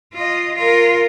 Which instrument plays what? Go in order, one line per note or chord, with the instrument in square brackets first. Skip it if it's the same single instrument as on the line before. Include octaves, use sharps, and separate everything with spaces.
[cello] F4 D#5
F4 A#4